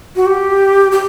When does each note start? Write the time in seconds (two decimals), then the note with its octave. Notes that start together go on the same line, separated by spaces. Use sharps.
0.16 F#4
0.26 G4
0.92 G4